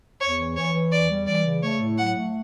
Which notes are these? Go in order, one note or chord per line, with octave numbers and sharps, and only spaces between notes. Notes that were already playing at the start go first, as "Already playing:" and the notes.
E2 C#5
E3
E3 C#5
E3
E2 D5
G3
E3 D5
C#3
A3 C#5
A2
F#3 F#5
A3